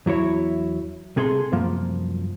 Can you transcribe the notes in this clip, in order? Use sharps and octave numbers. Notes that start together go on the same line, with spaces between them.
E2 F#3 E4 C#5
C2 C3 G#4 A4 B5 C6
C2 F#2 F3 A#3